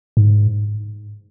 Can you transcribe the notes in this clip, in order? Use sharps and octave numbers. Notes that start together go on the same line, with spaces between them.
G#2